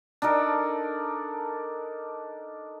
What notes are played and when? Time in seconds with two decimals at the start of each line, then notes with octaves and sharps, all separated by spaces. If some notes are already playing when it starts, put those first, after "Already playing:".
0.22 D4 D#4 A4 A#4